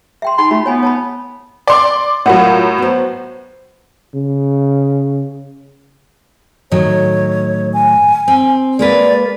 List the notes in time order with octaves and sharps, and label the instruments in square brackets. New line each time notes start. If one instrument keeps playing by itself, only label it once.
[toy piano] E5 G5 C6
[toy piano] D#4 G5 B5 [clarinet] C6
[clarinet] A3 [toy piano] F4 F#4 B5
[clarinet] B3 [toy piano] C#5 G#5 B5
[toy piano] C#5 A5 B5
[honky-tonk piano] D5 C6 D6
[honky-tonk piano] A2 F#3 [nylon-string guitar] F4 A#4 F#5
[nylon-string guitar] B3 C5
[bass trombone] C#3
[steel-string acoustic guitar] A2 D#3 F#3 [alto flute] C#5
[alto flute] G#5
[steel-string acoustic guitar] C4
[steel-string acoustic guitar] G#3 A#3 B4 [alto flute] D5